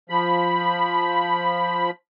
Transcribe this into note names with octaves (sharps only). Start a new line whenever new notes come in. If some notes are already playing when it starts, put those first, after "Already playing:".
F3 B5